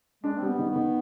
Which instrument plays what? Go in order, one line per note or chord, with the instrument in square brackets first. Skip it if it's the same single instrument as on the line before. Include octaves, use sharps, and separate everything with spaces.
[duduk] G#3 [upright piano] D4
[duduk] C4
[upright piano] G3 [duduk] B3
[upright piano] D#3
[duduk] B3
[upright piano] D#3